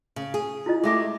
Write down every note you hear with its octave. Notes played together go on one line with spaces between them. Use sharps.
C#3
G#4
E4 F4 D#5
G#3 A3 G4 G#4 E5 D6